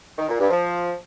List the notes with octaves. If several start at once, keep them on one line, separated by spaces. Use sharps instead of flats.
D#3
A#2
G2
F3